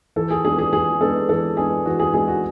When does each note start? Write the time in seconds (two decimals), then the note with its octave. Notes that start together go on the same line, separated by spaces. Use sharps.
0.16 E3 A4
0.30 G#4
0.44 G#3 B3 D4 G#4
0.59 G#4
0.73 E3 G#4
1.01 G#3 B3 D4 A4
1.29 E3 A4
1.57 G#3 B3 D4 G#4
1.86 E3 F#4
2.00 G#4
2.13 G#3 B3 D4 G#4
2.28 F#4